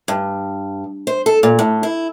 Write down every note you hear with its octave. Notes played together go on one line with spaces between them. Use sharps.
G2
C5
A4
A#2
A2
E4